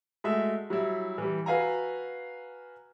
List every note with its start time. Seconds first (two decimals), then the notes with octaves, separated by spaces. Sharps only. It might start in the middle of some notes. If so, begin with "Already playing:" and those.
0.24 G#3 A3 F#4 E5
0.70 F#3 G3 E4
1.18 E3 G3
1.46 F#4 B4 F5 G#5 A#5